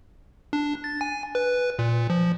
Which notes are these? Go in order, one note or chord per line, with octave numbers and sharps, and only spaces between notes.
D4
A6
G#5
B4
A#2
F3